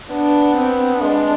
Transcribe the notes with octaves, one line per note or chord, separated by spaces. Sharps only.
B3 D4
C4
G#3 D4